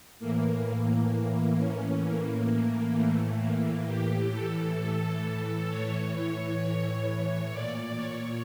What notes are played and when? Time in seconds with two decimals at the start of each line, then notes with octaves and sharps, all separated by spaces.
0.20 A2 E3 A#3
1.57 C#4
2.02 A2 E3 A#3
2.94 A3
3.40 A#3
3.85 A2 E3 G4
4.31 A4
4.76 A4
5.68 A2 E3 C#5
6.14 C#5
7.05 C#5
7.51 A#2 D5
7.97 C#5